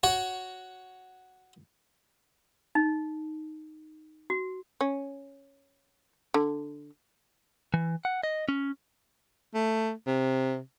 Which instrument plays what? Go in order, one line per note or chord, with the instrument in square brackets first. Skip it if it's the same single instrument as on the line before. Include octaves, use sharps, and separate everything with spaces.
[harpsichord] F#4 C#5
[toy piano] D#4
F#4
[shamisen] C#4
D3
[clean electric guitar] E3
F#5
D#5
C#4
[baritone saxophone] A3
C3